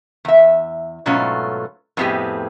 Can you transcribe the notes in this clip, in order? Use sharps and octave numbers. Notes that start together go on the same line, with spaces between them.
E2 E5
G#2 B2 F#3 A3 C#4 F4
F2 A2 B3 C4 G4 G#4